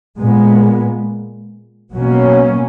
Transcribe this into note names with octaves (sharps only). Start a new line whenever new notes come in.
A#2 G#3 B3
B2 F#3 A#3 C#4